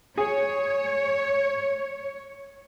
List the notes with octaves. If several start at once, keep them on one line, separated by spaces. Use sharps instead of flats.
G#4 C#5